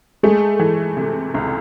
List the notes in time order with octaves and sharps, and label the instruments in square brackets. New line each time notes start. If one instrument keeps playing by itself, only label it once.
[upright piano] G#3 [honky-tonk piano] A3
[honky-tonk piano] E3
C3
C#2